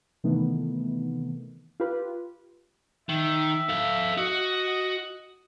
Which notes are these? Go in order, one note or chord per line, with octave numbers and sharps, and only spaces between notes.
C3 D#3 E3 A3 B3
F4 G4 B4
D#3 E5
A4 F5
F#4 D#5